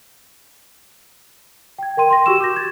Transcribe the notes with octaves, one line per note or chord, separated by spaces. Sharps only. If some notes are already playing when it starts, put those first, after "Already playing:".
G5 G#6
A#4 G5 C6 D#7
C6 A#6
F#4 G4 C#6 E6 E7
D6 G6 A#6
G#6 A6